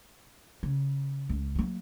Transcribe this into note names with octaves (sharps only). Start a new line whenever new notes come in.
C#3
C#2
F#3 A#3